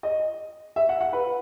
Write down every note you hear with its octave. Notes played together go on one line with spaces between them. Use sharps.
D#5
E5
F#5
F#5
B4